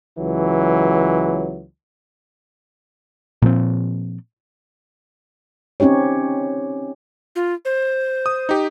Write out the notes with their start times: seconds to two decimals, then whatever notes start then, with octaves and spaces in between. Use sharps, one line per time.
0.19 C#2 E3 F#3
3.42 A#2 F3 C4
5.80 C4 C#4 D#4 G4 C#5
7.36 F4
7.65 C5
8.26 D#6
8.49 D#4 G4